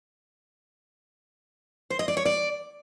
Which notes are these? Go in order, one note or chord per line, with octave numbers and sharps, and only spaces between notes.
C5
D#5
D5
C#5
D5